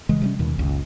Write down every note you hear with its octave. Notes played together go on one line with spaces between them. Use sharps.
F1 C#3 E3 G#3
C3 G3 C#4
D#2 B2 D#3
F#1 C#2